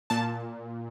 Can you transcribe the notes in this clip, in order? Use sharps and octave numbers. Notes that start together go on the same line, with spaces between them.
A#2 A5